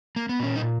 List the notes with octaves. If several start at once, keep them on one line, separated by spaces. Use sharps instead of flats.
A#3
B3
A#2 C#4
D#4